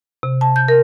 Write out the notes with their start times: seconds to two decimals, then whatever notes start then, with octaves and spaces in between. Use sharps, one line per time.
0.23 C3
0.41 A5
0.56 G6
0.68 A#4